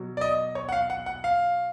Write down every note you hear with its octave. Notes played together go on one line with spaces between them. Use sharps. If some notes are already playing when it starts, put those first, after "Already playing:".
Already playing: B2 F#3
D5
D#5
C#5
F#5
F5
F#5
F#5
F5